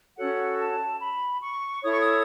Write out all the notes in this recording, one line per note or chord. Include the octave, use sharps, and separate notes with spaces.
C#4 F#4 A4 C#5 F#5
A5
B5
C#6
E4 A4 C#5 D#6
C#6
D#6